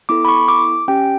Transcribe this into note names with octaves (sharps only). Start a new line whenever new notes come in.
B3 E4 A4 D6
B5
C#6
D6
C#4 G4 G5